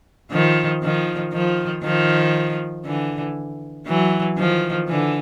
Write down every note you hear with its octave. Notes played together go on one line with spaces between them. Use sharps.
D#3 F3
D#3 F3
D#3 F3
D#3 F3
D3 E3
E3 F#3
D#3 F3
D3 E3